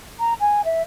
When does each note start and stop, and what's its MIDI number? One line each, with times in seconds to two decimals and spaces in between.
0.19 0.34 82
0.40 0.61 80
0.64 0.82 76